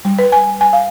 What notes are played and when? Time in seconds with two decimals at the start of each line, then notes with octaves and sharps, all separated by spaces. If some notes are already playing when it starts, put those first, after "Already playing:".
0.05 G3
0.19 B4
0.32 G#5
0.61 G#5
0.73 F5